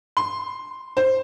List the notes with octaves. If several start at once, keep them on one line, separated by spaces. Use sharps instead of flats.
C6
C5